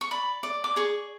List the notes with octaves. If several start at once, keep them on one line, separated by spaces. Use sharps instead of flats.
C#6
D5 B5
D5
D6
G#4 C#6